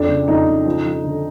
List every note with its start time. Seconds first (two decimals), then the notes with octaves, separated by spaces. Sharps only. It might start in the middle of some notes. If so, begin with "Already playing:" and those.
Already playing: F2 D4
0.09 C#3
0.28 F2 D#4
0.47 C#3
0.65 F3
0.85 F3
1.04 D3